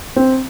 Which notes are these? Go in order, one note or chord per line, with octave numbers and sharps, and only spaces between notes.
C4